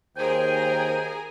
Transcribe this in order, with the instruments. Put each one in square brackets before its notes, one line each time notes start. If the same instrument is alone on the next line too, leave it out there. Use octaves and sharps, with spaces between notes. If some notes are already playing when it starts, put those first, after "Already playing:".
[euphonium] D#2 [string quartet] G#4 A#4 G#5 [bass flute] C5 [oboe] G5